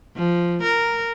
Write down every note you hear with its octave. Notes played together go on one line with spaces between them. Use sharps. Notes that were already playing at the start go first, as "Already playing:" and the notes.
F3
A#4